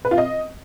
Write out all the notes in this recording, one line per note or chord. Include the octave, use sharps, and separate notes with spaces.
B4
F4
D#5